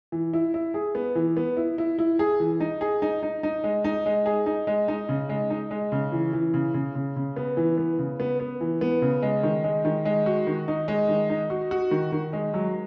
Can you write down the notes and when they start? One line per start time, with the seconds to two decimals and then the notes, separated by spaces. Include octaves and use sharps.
0.12 E3
0.33 E4
0.54 E4
0.74 G#4
0.95 B3
1.15 E3
1.37 B3
1.57 E4
1.78 E4
1.99 E4
2.19 G#4
2.40 E3
2.60 D#4
2.81 G#4
3.02 D#4
3.23 D#4
3.43 D#4
3.64 G#3
3.84 D#4
4.06 G#3
4.26 G#4
4.46 D#4
4.67 G#3
4.88 D#4
5.09 C#3
5.29 G#3
5.50 D#4
5.71 G#3
5.92 C#3
6.12 E3
6.33 E3
6.54 C#3
6.74 C#3
6.95 C#3
7.16 C#3
7.36 B3
7.57 E3
7.78 B3
7.99 C#3
8.20 B3
8.40 B3
8.61 E3
8.81 B3
9.02 C#3
9.22 G#3
9.43 D#3
9.64 G#3
9.85 D#3
10.05 G#3
10.26 F#4
10.47 D#3
10.68 D#4
10.88 G#3
11.09 D#3
11.30 D#4
11.50 F#4
11.71 F#4
11.91 D#3
12.12 D#3
12.33 G#3
12.54 F#3